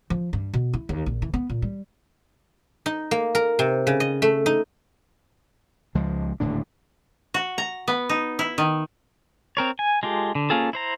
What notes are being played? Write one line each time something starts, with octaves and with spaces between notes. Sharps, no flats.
F3
G2
B2
E4
D#2
A#1
E3
B3
A#2
G3
D#4
A#3
A#4
C3
C#3
D#5
A3
D#4
C#2 F3 G#3
D#1 A2 D3 D4
F#4
A#5
B3
D#4
E4
D#3
C4 A#4 C#5
G#5
G#3 F4 G4 A4
D3
A#3 C#4 F4 G#4 A4
E4 C5 A#5